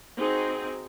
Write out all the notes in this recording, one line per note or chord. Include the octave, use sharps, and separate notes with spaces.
C4 D#4 F#4 G#4